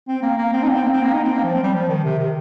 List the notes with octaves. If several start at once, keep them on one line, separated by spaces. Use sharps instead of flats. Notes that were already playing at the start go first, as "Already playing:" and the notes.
C4
A#3
A#3
C4
D#4
A#3
C4
A#3
C4
A#3
D#4
C4
A#3
F3
C4
G3
F3
D#3
C3
D#3